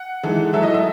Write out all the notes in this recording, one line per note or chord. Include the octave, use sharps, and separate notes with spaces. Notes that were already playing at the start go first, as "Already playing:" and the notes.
Already playing: F#5
E3 G#3 D#4 A4
F#3 A3 E4 A4 E5
D#5
E5